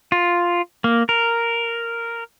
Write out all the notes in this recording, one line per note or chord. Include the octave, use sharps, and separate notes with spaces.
F4
A#3
A#4